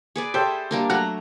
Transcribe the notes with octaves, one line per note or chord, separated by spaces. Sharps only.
G#4 B4 D5
G4 A4 C5 E5
G3 A#3 D4
F#3 A3 F#5 A#5